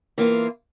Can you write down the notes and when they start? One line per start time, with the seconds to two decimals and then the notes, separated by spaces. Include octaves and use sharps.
0.18 E3 A#3 F4